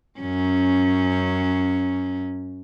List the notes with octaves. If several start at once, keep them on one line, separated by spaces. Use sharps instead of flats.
F#2 C#4